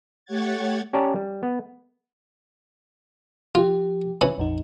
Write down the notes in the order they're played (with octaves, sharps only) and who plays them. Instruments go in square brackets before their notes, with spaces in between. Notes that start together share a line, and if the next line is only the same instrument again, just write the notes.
[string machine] A3 G4 C#5 F#5 G#6 A6
[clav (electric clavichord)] C#4 G4 C#5 D5 A5 A#5
G3
B3
[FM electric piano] F3 G4 [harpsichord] F4
[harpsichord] E3 C#4 B5
[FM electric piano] A#1 F2 D#4